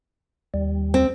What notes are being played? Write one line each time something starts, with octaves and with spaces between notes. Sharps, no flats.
D#2 G3
C4